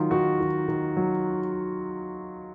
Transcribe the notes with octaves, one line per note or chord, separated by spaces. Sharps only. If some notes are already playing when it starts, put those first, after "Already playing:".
Already playing: D#3 F#3 F4
D#3 F#4
D#3
D#3
F#3